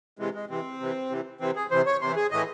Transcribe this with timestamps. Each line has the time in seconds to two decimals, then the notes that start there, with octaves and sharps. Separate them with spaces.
0.19 C3 E3 G#3
0.35 G#3
0.50 C3 E3 C4
0.80 C3 E3
1.10 C3 E3
1.40 C3 E3 C4
1.56 G#4
1.71 C3 E3 C5
1.86 C#5
2.01 C3 E3 C5
2.16 G#4
2.31 A2 E3 D#5